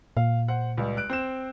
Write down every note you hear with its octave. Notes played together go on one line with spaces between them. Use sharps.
A#2 F5
C5 F#5
C#2 G3
F#6 D7
C4 C5 E7